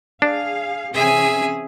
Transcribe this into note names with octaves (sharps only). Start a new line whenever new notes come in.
D4 G#4 F5
C3 E3 C#4 G#4 E5 G#5